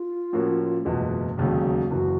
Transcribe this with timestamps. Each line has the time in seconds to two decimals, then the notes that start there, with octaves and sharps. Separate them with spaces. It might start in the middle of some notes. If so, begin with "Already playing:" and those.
Already playing: F4
0.33 A2 F3 A#3 C#4 F#4
0.85 F#1 E2 B2 G#3 B3
1.38 E1 D#2 C#3 F#3 A3 F#4
1.90 F#1 F#2 C#3 E3 F#4